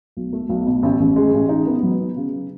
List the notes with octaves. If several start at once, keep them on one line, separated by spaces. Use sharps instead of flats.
B1
A3
B1
B2
A1
A1
G#3
A1
D#4
B3
F#3
B3
C#3